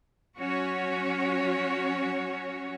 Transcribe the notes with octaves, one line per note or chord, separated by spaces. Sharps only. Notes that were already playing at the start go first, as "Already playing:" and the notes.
F#3 C#4 F#4 C#5